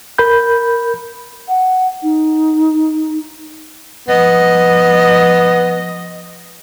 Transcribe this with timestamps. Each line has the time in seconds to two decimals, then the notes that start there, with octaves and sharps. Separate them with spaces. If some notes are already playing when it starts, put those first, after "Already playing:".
0.18 A#4 B5 G6
1.49 F#5
2.03 D#4
4.08 F3 B3 D#5